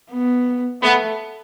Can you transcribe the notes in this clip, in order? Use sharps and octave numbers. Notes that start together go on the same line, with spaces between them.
B3
A3 B3